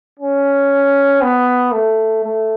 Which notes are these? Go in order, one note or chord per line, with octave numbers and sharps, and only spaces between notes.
C#4
B3
A3
A3